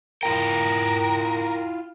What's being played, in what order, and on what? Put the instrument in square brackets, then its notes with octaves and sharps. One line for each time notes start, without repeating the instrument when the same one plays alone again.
[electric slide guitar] E4 F4 G5 [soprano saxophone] A#4